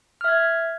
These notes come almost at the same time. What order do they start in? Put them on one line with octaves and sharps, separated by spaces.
F6 E5 G#6